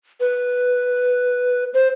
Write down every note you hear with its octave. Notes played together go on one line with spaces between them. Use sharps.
B4
C5